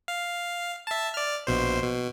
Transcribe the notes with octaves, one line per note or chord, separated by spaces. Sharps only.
F5
E5 A5
D5 F6
A#1 B2 C5
B2